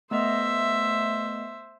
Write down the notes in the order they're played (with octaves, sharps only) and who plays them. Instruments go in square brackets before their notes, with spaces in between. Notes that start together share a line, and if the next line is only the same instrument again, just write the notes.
[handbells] A3 B3 D#5 [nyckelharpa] C5 E5